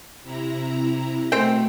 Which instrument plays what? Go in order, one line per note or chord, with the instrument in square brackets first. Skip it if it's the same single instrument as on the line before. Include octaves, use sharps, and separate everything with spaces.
[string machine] C3 E4 A#5
[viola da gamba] B2 A3 [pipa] C4 G5